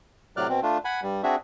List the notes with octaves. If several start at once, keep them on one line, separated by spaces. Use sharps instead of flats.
A2 C3 F#3 D5 F6 F#6
B2 C4
A3 D4 F4
F#5 G#5 B5
G2 G3
C4 D4 F#4 G#4 E5